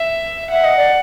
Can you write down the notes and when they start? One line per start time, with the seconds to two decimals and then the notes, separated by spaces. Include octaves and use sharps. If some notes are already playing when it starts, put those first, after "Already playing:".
Already playing: E5
0.52 E5 F#5
0.64 D#5
0.77 D5